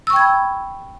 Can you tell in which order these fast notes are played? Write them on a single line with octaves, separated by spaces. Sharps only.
E6 C#6 G5 G#6 B5